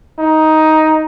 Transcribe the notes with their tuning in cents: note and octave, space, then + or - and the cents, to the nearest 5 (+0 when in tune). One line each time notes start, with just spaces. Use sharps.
D#4 +10